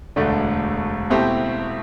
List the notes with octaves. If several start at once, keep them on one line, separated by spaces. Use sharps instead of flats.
E1 D2 D3 A3 D4
B2 A3 C4 E4 G4